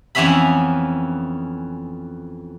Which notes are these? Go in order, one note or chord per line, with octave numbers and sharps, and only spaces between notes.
F2 E3 B3 C#4 E5 B5